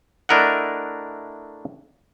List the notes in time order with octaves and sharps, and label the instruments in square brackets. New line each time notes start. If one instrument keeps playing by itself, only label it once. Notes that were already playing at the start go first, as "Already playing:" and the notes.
[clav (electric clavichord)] A3 D4 E4 A#4 D#5 F#5